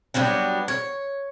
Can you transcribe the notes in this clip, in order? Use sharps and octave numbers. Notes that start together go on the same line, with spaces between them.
F#3 G3 B3 D4
C#5